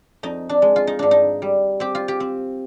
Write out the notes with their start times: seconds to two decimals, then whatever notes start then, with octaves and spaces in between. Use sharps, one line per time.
0.23 F2 D#4
0.49 D4
0.62 G#3
0.76 F4
0.87 D#4
0.99 G#2 D4
1.11 D#4
1.42 G3
1.80 C4 G4
1.95 F4
2.08 G4
2.20 C4